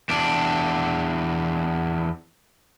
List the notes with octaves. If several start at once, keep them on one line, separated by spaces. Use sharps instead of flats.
E2 D4